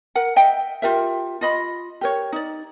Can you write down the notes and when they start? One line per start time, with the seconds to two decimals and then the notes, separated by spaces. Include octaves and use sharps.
0.15 A#4 F#5
0.36 D#5 E5 G5
0.82 F4 G4 A#4 E5
1.41 F4 D#5 B5
2.01 G4 A#4 C#5
2.32 D#4 D5